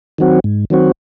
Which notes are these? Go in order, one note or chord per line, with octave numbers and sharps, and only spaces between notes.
D#3 F#3 C4 F#4
G#2
D#3 F#3 C4 F#4